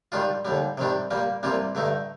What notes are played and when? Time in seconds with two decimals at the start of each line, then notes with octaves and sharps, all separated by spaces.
0.12 D#3 G3 D4 F4
0.45 D#2 D3 G3
0.78 C3 D#3 G3 D4
1.11 A#2 G3 A#3
1.43 C2 C3 G3 A#3 F4
1.75 G2 D3 A3 D#4